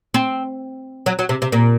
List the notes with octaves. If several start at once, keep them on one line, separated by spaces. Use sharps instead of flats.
C4
F#3
F#3
C3
C3
A#2